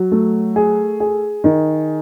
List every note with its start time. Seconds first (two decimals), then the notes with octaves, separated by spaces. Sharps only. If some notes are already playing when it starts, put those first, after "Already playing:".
Already playing: F#3
0.12 A3
0.56 G#4
1.00 G#4
1.44 D#3